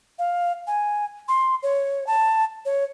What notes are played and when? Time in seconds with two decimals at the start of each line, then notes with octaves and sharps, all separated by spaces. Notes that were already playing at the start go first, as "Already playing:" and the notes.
0.19 F5
0.67 G#5
1.28 C6
1.63 C#5
2.07 A5
2.65 C#5